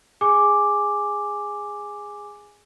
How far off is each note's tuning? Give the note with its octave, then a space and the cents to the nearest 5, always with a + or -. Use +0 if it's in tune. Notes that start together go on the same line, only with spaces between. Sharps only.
G#4 -10 G#5 +0 D6 +0